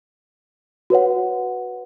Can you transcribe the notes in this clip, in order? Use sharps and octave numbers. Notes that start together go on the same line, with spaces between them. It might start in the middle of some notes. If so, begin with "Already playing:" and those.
F#4 B4 C#5 F#5